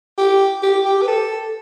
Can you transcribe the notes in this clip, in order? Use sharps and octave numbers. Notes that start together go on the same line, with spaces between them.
G4
G4
G4
B4
A4